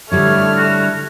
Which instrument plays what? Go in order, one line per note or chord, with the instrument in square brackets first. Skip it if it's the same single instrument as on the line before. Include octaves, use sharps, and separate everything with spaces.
[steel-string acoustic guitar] D3 G3 E4 [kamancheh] A3 F6 [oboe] C#5
[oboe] F#4